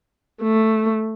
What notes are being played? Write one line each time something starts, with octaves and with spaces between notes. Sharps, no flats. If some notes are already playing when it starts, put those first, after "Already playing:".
A3